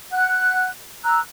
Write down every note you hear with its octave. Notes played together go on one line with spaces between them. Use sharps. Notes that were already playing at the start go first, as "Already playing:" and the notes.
F#5 F#6
A#5 E6 F#6